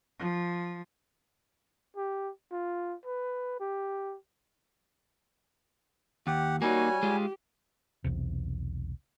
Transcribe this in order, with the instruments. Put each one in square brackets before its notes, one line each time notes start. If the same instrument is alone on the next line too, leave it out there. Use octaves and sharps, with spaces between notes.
[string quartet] F3
[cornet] G4
F4
B4
G4
[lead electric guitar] D#2 [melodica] G4 F#5
[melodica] G3 G#5 [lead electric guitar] A#3 D#4 [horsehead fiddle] F#4 C#5
[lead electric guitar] G#3 F4 [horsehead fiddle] G4
[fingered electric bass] B1 E2 C3